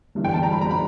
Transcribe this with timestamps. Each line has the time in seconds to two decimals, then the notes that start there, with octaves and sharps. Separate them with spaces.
0.15 G1 G2 E3
0.24 G5
0.34 A5
0.43 A#5
0.52 B5
0.61 A#5
0.71 B5